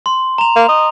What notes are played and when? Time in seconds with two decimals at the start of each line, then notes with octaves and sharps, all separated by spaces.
0.06 C6
0.38 A#5 F7
0.56 A#3
0.69 D#5